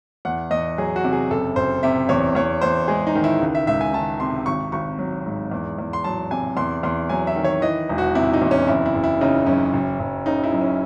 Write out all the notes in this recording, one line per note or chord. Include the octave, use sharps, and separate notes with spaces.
E2 F#5
E2 D#5
F#3 G#4
F#4
C3
G#4
F#1 A4
F#1 C5
C3 E5
E2 C#5
E2 C#5
E2 C5
G#3 G#4
D#4
D#3
E4
C#2
E5
C#2 E5
G#5
D#3 A5
C3 C6
G#1 C#6
G#1 C#6
F#3
G#2
E2
E2
C6
F#3 A5
C3 G#5
E2 C6
E2 C6
F#3 G#5
E5
D#3
C#5
E3 D#5
E1
F#4
C3 E4
D#4
E2
C#4
F#1 E4
E4
F#1
E4
C#3 D#4
F#2 C#4
F#1
F#1
C#3 D#4
E4
F#2
C#4